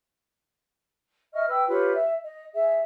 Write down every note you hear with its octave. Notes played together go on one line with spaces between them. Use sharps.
D#5 E5 C#6 F6
B4 G5 E6
F4 G4 B4 C#5
E5
D#5
G#4 E5